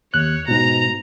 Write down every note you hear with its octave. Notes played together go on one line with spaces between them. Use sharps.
D#2 C#5 F#6
G#2 B2 A#5